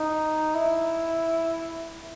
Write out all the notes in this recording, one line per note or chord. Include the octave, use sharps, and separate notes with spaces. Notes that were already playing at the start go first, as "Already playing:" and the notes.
Already playing: D#4
E4